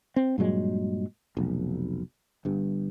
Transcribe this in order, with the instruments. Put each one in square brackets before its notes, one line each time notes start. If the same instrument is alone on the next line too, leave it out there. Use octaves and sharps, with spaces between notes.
[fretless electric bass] C4
G2 A#2 F#3 G#3
F1 B1
G1 G2